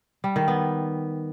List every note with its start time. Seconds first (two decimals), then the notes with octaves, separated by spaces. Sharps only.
0.24 G3
0.36 D#3
0.48 B3